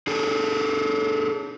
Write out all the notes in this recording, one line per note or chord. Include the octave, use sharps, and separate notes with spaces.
D4 G#4 A4